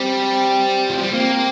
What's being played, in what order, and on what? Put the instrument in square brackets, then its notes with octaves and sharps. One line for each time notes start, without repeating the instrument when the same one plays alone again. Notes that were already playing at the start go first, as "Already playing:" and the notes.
Already playing: [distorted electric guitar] G3 [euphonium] C4
[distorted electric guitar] F3
G3
[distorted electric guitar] A#3 [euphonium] C4